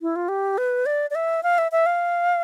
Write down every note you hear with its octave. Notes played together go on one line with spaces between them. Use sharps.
E4
F4
G4
B4
D5
D5
E5
F5
E5
E5
F5